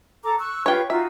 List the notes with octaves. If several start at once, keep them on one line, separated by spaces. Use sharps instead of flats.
A4 A#5 D6
C#6 E6 F#6
F4 G4 B4 C#5 G5
D#4 F4 F#4 E5